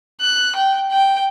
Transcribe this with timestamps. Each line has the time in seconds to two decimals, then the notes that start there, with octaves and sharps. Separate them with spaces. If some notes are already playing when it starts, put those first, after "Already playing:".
0.21 F#6
0.55 G5
0.91 G5